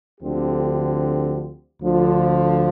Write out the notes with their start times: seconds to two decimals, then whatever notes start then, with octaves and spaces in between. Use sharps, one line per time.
0.20 D2 D3 F3 C4 G4
1.82 D2 D3 F3